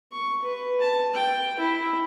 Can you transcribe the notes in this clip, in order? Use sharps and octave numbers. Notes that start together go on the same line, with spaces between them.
C#6
B4
A5
G5
E4